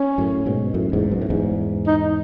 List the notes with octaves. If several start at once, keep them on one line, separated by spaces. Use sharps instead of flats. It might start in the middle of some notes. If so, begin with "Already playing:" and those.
Already playing: C#4
F#2 A2
G#2 B2
F#2 A2
E2 G#2
F#2
A2
E2 G#2
D#4